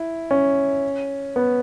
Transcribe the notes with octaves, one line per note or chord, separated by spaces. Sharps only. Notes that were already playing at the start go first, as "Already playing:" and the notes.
Already playing: E4
C#4
B3